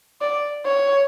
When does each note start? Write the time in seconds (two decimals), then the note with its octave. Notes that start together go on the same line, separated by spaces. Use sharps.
0.21 D5
0.66 C#5